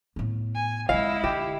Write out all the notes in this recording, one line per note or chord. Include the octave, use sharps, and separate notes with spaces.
A2 B3
G#5
C3 G#3 E4 D#5 F5
D3 G4